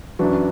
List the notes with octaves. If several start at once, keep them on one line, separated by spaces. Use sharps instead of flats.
F#2 E3 D4 F#4